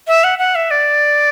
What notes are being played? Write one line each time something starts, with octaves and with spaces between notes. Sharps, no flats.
E5
F#5
F#5
E5
D5